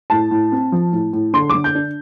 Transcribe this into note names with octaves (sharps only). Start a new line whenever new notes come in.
A2 A5
A2
C4
F3
A2
A2
D3 C6
D6
D3
G6
D4